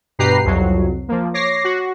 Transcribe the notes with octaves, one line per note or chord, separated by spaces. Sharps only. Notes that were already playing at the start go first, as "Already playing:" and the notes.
G2 B2 G4 B4 A#5 C7
C2 F2 F#3
F3 A#3
C#5 D6 A#6 C7
F#4